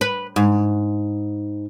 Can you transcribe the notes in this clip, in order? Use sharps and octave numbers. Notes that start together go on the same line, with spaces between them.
B4
G#2